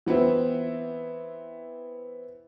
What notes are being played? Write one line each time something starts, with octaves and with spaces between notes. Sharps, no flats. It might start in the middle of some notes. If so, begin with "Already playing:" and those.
E3 B3 C4 E4